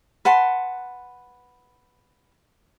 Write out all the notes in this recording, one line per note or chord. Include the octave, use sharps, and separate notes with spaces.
B4 F#5 A5 C6